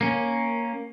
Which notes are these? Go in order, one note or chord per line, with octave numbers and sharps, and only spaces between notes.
A#3 C#4